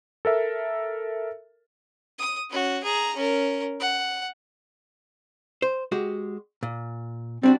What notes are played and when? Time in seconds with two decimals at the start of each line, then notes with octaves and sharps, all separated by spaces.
0.25 A4 A#4 E5
2.19 D#6
2.50 C#4 F#4
2.83 G#4 A#5
3.16 C#4 A#4
3.80 F#5
5.62 C5
5.92 G#3 F#4 G4
6.63 A#2
7.43 G3 C4 D4 F#4